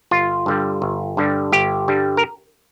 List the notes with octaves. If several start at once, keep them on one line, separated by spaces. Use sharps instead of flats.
G1 F4
G2 D3 G3
G1
G2 D3 G3
G1 G4
G2 D3 G3
A#4